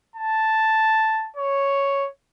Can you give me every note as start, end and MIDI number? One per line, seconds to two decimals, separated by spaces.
0.16 1.28 81
1.36 2.08 73